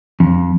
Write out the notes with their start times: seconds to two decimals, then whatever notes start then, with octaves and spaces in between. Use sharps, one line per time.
0.20 F2